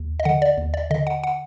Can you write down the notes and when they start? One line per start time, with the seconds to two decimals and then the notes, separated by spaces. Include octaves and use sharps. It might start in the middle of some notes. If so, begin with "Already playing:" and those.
Already playing: D#2
0.20 D#5
0.25 D3 F#5
0.42 D5
0.58 D#2
0.74 D5
0.91 D3 D#5
1.07 F#5
1.24 F#5